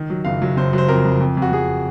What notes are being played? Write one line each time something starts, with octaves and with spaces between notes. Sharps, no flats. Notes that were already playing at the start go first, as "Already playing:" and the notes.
Already playing: D#3
F#3
F#1 F5
F#3
F#1 C5
F#3 C5
F2 A#4
F2
F2
F2
F#4
F2 G#4